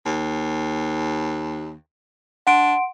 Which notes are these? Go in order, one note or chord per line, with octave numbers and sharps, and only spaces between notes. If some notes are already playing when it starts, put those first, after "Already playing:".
D#2
D4 F#5 C6 D7